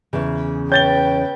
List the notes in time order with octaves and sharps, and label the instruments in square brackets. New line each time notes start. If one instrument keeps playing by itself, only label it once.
[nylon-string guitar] E2 C#3
[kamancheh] B4 G5 [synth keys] C#5 [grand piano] G6 A6 G7